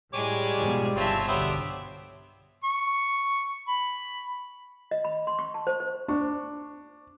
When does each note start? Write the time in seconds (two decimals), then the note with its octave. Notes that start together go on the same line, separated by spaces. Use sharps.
0.13 A2 G3 G#3 C#5 G#5 D6
0.56 G#2 B2 F3
0.97 G1 C2 C4 F4 C#5 E5 A5
1.28 B1 D3 G3 B3 C5 C#5 E5 D6
2.64 C#6
3.68 B5
4.91 D#5
5.05 B5
5.27 C6
5.39 C#6
5.54 A5
5.67 C5
5.80 C5
6.08 D4 C#6